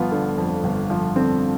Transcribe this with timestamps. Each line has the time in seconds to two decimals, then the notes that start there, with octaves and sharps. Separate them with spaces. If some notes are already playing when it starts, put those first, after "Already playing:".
Already playing: G1 F3 B3 F4
0.12 D3
0.38 F2
0.64 G1
0.90 F3
1.16 D3 C4